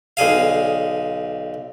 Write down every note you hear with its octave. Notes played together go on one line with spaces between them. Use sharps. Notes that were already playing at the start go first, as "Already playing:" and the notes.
B1 D3 G#4 F5